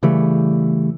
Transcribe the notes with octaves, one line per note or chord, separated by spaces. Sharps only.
C#3 E3 G3 A3